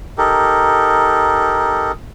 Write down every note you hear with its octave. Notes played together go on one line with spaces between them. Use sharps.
D#4 G4 A4 A#4